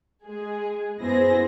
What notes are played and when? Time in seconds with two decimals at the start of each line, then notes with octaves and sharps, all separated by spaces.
0.24 G#3 G#4
0.98 F#2 B3 E4 G#4 C5 A#6